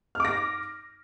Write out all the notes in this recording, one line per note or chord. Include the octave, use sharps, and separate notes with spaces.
D6 F6 A#6